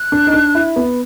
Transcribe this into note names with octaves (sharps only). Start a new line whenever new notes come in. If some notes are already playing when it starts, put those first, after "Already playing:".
Already playing: F#6
D4
D#4
D4
E4
B3